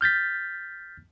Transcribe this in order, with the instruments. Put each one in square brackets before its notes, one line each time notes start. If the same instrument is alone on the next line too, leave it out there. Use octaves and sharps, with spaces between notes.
[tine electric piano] F6 G6 A6 B6